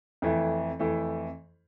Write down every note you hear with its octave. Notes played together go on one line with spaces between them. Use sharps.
F2 E3 A3 E4
F2 E3 A3 E4